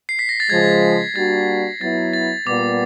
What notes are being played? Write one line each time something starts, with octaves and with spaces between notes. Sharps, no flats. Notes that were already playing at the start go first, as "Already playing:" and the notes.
C7
B6
A#6
A6
C#3 F3 G#3 G#6
G3 A#3 D4 F#4 A6
F#3 B3 E4 A6
A6
A#2 G3 B3 D6